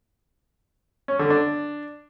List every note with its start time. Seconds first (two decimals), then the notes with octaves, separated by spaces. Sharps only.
1.08 C#4
1.19 D3
1.30 D4